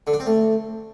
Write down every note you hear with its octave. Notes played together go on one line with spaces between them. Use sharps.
D3
D4
C4
A3